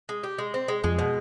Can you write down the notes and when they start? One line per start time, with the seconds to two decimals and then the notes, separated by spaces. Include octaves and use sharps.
0.09 G#3
0.23 G4
0.38 G#3
0.54 C4
0.68 G#3
0.84 F2 G#3
0.99 B2